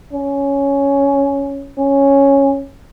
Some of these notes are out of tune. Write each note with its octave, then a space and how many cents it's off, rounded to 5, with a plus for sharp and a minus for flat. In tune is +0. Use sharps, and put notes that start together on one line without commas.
C#4 +5
C#4 -5